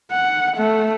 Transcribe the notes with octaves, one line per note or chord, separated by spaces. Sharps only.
F#5
A3